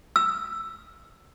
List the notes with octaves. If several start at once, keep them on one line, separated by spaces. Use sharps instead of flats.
E6